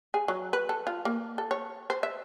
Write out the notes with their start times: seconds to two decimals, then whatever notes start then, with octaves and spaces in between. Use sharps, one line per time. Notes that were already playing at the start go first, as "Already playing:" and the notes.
0.14 G#4
0.28 F#3
0.53 B4
0.69 A4
0.87 F4
1.05 A#3
1.38 A4
1.51 C#5
1.90 C5
2.03 E5